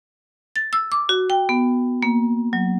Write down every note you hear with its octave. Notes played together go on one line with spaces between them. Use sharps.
A6
E6
D6
F#4
G5
B3
A#3
F#3